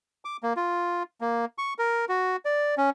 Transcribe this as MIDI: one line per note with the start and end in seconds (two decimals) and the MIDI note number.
0.25 0.37 86
0.43 0.53 58
0.57 1.03 65
1.21 1.45 58
1.58 1.73 85
1.78 2.05 70
2.09 2.36 66
2.45 2.75 74
2.78 2.90 61